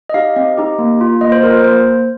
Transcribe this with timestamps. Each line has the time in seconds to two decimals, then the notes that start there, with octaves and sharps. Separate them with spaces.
0.10 D#5
0.14 D#4 G4 F5
0.36 C4 D#5
0.57 D#4 G4
0.79 A#3
1.01 F4
1.21 A#3 D#5
1.32 C5
1.43 F4 A#4
1.54 C5
1.64 A#3 C5